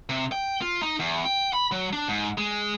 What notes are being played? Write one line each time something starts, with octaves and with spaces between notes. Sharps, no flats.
C3
G5
F4
D#4
E2
G5
B5
F#3
D4
G#2
G#3